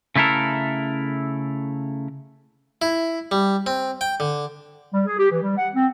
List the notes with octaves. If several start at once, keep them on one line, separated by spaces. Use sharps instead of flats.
C#3 A3 E4 A4 A#4
E4
G3
C4
G5
D3
G3
G#4
G4
E3
G3
F#5
C4